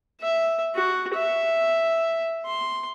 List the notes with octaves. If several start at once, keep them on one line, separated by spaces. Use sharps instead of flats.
E5
F#4
E5
C6